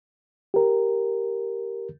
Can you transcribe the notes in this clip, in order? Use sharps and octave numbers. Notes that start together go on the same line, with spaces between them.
G4 A#4